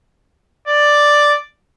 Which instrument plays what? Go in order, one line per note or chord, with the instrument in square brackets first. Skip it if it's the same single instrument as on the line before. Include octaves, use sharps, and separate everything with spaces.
[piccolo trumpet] D5